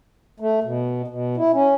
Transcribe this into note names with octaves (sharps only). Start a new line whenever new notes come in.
A3
B2
B2
E4
C#4